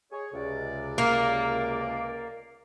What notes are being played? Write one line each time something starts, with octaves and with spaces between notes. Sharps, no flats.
G#4 C#5
C#2 C3 D5
A#3